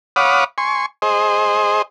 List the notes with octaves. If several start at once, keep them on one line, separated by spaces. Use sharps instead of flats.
C#5 F5 F#5 B5 D6 D#6
G#5 C6 C#6
G#4 C5 D#5